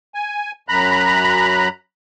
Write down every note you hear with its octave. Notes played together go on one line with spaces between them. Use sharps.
G#5
F#2 A#5 B5 F#6